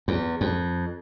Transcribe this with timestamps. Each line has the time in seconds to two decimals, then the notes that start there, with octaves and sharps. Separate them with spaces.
0.08 E2
0.41 F2